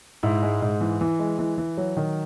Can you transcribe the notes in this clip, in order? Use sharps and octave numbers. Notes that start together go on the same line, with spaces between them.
G#2 E4
G#3
G#2
E3
E3
G#3
E3
E3
F#3
D#3